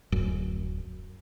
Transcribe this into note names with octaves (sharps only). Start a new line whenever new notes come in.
D1 F#2